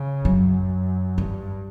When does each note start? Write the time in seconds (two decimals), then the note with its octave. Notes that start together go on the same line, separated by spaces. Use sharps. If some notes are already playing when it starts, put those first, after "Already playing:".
Already playing: C#3
0.25 F#2 F#3
1.18 G2 E3